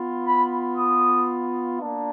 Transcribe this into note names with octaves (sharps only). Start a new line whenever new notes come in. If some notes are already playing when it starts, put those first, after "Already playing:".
Already playing: B3 F4
B5
D#6
A#3 D4